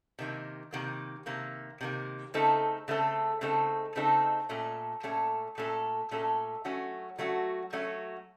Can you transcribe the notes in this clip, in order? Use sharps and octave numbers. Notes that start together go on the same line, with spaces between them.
C3 D#3 A#3
C3 D#3 A#3
C3 D#3 A#3
C3 D#3 A#3
C#3 A3 C4 D#4 A4
C#3 A3 C4 D#4 A4
C#3 A3 C4 D#4 A4
C#3 A3 C4 D#4 A4
A#2 A3 C#4 A4
A#2 A3 C#4 A4
A#2 A3 C#4 A4
A#2 A3 C#4 A4
F#3 A3 C#4 F#4
F#3 A3 C#4 F#4
F#3 A3 C#4 F#4